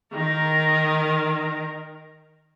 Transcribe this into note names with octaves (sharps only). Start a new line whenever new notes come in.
D#3 A#4